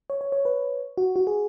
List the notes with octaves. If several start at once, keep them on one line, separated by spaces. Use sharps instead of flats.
C#5
C#5
C#5
B4
F#4
F#4
G#4